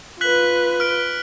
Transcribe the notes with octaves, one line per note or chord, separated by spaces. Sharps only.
F4 B4 F#6 B6 F#7
F6 D7